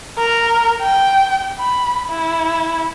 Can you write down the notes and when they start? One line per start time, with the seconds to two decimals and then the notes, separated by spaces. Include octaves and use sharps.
0.18 A#4
0.82 G5
1.59 B5
2.09 E4